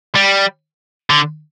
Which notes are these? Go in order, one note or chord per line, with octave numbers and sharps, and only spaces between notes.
G3
D3